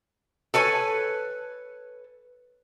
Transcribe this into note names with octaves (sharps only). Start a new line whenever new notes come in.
A4 B4 C#5 G#5